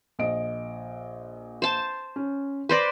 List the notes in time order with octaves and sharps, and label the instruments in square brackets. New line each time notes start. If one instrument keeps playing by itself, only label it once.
[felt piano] A#1 D#5 D7
[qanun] C5 A5
[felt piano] C#4
[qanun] B4 C5 D5 [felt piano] C6 A#6